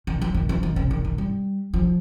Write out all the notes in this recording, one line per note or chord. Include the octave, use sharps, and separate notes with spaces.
D#3
F3
D#3
F3
D#3
C#3
D#3
D#3
G3
F3